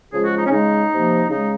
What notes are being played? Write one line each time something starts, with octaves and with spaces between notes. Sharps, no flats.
C#3 F3 G#3 G#4
F#4
D#4
C#4
C#3 G#3 D#4
C3 F3 A#3
C#3 G#3 D#4